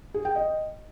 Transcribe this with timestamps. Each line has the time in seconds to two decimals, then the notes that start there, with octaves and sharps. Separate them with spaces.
0.14 G#4
0.25 G5
0.36 D#5